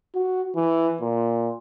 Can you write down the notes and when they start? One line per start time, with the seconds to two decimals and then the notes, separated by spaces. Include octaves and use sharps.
0.15 F#4
0.56 E3
1.01 A#2